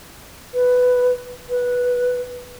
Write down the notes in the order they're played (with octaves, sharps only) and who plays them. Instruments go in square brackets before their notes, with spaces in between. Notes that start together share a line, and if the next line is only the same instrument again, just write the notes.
[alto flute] B4
B4